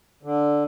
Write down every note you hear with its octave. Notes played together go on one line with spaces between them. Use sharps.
D3